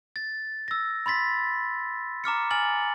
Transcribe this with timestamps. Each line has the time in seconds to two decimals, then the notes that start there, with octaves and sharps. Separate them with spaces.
0.16 A6
0.68 E6 A#6
1.06 B5 C6 A6 B6
2.24 A#5 D6 F6 C#7
2.51 G#5 F6 A6 F#7